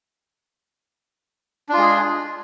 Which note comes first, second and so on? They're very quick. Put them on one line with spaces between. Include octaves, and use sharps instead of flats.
D4 F4 G#3 G#4